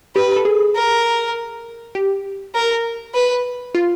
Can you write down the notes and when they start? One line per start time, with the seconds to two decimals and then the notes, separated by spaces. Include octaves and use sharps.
0.15 G4 B4
0.36 A4
0.45 G#4
0.75 A#4
1.95 G4
2.55 A#4
3.14 B4
3.75 F4